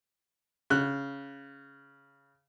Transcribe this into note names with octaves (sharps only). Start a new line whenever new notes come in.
C#3 F#6